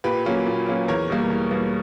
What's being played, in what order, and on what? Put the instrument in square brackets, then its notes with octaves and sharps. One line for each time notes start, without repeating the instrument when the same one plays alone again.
[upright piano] A#2 G4 B4
F#3 A#3 C#4
A#2
F#3 A#3 C#4
E2 A#4 C#5
B2 G3 A#3
E2
B2 G3 A#3